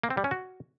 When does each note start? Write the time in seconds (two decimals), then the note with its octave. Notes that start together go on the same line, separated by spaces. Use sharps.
0.04 A#3
0.10 C4
0.17 G3
0.24 C#4
0.31 F#4